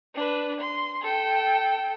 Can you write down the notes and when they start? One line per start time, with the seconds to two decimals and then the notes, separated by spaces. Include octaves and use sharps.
0.15 D4 B4
0.61 C6
1.02 A4 G5